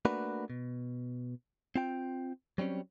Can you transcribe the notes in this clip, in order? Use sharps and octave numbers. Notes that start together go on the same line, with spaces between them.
A3 A#3 D4 F#4 B4
B2
C4 F4 G5
F#3 G3 C4 C#4